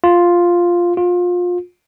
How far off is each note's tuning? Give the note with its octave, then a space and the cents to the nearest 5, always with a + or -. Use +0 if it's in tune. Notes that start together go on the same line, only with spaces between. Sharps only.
F4 +0
F4 +25